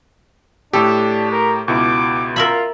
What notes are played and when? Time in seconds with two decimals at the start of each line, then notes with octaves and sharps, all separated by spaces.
0.73 A2 D4 G4 A4
1.32 A#4
1.68 C#2 B2 E4 D6
2.36 F4 A#4 E5 B5